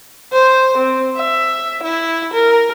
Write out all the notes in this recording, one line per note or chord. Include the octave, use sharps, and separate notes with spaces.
C5
C4
E5
E4
A#4